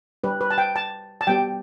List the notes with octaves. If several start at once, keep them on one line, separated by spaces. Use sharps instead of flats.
G3 D4 G4 B4
B4
A5
G5
A5
A5
G3 B3 G4 G5